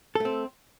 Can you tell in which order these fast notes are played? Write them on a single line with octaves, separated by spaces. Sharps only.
A4 A3 C4